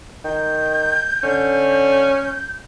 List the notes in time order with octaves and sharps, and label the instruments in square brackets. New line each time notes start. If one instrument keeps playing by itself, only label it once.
[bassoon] D#3 [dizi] G6
[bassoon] D3 [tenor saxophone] C#4
[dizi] G6